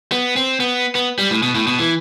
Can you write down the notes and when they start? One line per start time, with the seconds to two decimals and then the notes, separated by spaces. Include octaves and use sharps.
0.12 B3
0.36 C4
0.60 B3
0.95 B3
1.18 G3
1.30 A2
1.43 B2
1.55 A2
1.67 B2
1.79 E3